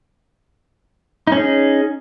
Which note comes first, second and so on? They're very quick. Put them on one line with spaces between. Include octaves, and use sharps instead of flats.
D#4 C#4 G#4